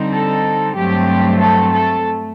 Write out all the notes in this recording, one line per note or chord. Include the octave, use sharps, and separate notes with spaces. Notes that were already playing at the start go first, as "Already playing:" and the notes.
Already playing: D3 G3 C4 D#4
A4
G2 F#3 A3 C4 G4
A4
A4
A3